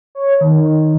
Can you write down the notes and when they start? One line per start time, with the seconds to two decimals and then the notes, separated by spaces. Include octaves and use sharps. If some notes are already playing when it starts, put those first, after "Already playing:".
0.15 C#5
0.41 D#3